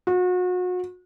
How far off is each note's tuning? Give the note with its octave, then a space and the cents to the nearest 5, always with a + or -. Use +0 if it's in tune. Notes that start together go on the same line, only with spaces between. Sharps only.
F#4 -35